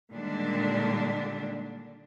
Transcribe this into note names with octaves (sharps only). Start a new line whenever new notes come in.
A#2 D3 D#3 G3 G#3 D4